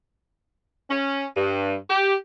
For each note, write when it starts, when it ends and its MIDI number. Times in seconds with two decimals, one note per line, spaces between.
0.90 1.25 61
1.36 1.76 43
1.90 2.15 67